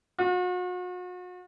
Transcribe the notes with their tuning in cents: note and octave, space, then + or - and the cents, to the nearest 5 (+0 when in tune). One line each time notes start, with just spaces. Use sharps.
F#4 -40